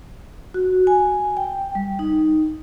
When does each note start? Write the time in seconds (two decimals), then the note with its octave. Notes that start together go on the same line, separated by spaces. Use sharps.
0.54 F#4
0.87 G#5
1.37 G5
1.75 G3
1.99 D#4